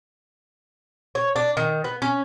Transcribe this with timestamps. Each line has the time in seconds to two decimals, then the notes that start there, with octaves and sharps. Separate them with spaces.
1.15 C#5
1.36 D4
1.57 D#3
1.84 B3
2.02 C#4